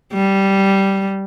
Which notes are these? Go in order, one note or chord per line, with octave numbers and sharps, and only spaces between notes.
G3